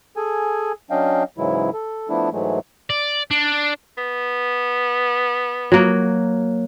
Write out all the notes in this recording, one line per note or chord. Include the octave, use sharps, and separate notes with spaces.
G#4 A4 G#5
F#3 C#4 D4 D#5 F5 G5
G#2 C#3 E3 F#3 G#3 E4
A4
F3 A3 B3 D4 E4
G#2 E3 F#3 G#3 A3
D5
D4
B3
F#3 A#3